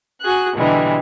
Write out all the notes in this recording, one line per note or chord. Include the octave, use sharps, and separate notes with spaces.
F#4 G#4 F#6
B2 D3 E3 G3 G#3